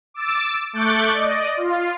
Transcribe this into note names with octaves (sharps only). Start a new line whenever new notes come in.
D6 E6 A6
A3 C#6 D6 F#6 G6 A6
D5 D#5
F4